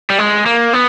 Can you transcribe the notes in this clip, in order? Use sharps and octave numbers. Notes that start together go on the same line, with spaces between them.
G3
G#3
A#3
B3